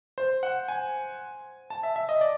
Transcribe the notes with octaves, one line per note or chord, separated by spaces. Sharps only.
C5
F#5
G#5
A5
E5
E5
D#5
D5